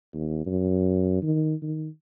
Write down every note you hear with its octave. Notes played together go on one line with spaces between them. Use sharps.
D#2
F#2
D#3
D#3